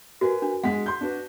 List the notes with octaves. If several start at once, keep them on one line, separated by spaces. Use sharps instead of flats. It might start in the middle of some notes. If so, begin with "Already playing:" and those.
F#4 A#4 B4 G#5
D4
G#3 F#5 B6
C6 G6
D4 F#4 B4